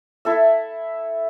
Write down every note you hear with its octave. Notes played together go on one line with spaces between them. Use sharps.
E4 A4 E5